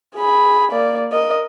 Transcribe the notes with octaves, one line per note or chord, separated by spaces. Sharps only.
G#4 B5
A#3 D5
A#4 D#5